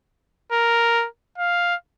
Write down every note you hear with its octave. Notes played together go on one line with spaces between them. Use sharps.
A#4
F5